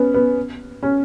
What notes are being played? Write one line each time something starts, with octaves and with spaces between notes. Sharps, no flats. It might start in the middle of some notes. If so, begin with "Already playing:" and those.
Already playing: B3 C#4
B3
C#4